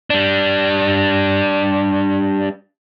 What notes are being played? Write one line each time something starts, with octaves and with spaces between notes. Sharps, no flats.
G3 D4